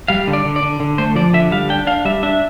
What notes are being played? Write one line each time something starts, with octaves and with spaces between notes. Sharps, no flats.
G3 F5
D3
D5
D3
D5
D3
D3
A3 C5
F3 D5
D3 E5
G3 F5
D4 G5
D4 F5
G3 E5
D4 E5